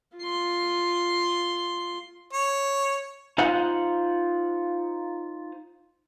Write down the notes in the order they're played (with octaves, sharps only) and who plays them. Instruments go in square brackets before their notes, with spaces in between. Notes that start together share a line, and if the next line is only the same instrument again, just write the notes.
[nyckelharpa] F4 C6
[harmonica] C#5
[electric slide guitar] D#4 F4 C5 F#5